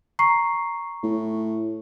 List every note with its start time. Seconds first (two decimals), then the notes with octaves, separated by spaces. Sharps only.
0.19 A#5 C#6 C7
1.03 A2